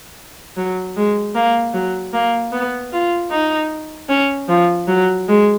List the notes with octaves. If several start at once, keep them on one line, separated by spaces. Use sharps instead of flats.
F#3
G#3
A#3
F#3
A#3
B3
F4
D#4
C#4
F3
F#3
G#3